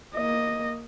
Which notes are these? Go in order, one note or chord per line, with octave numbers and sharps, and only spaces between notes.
A#3 D#5